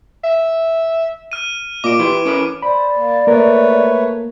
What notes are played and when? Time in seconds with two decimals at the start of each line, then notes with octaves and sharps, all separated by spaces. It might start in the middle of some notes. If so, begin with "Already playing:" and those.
0.24 E5
1.32 F6 D#7
1.84 A#2 D#5 D6 D7
1.99 E3 E4 G4 C6
2.25 C#4 A#4 B4
2.62 C5 D5 B5
2.96 A#3
3.27 A3 A#3 A#4 B4 C#5